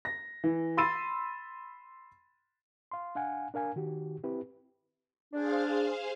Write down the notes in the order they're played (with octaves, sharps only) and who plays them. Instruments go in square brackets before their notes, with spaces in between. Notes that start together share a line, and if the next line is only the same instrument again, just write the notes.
[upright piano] A#6
E3
B5 C6 E6 A6 D#7
[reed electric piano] F5 C6
D4 F5 F#5 G#5
D4 A#4 F5 G#5
D#3 F#4 G4
C4 E4 G4 B4
[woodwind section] D4 [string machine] G#4 C5 F5